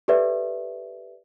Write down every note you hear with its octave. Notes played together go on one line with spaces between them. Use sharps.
G4 A4 B4 D5 E5